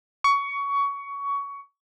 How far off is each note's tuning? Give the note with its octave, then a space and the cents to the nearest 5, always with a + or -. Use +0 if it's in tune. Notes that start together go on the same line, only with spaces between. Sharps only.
C#6 +20